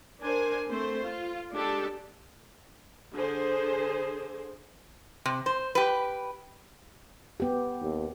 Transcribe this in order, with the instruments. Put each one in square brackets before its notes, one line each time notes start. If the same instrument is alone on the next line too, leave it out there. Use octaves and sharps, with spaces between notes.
[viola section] D4 A#4 C5 G#5
A3 C4 C5
F4
G#3 D4 G4 A4
D3 G#4 C5
[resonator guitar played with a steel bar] C3
C5
G4 B4
[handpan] B3 G4
[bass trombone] D#2